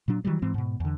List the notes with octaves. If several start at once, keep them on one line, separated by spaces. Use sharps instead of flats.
A#2 F#3 D4
D#3 E3 F#3 G3
G#2 E3 C4
G#2 B2
E2 D3